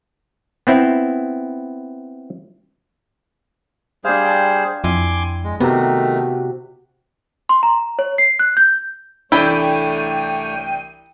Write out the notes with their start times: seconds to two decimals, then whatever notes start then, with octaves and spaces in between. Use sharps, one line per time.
0.67 B3 C4 E4
4.05 G3 D4 G#4 C5 F5
4.25 G5 A5
4.84 F2 E4 G#5 C6 D6
5.44 G#3
5.60 C3 D#3 A3 B3 F#4 A#5
7.49 C6
7.63 A#5
7.99 C#5
8.18 C7
8.39 F#6
8.57 G6
9.32 C2 E3 A3 D4 E4 C#5 G5 D#7